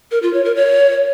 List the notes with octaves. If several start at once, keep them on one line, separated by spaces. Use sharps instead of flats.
A#4
F4
C#5
A#4
C#5